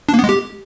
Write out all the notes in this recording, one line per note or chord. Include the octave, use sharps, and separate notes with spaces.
D4
A#3
B3
G#3
G4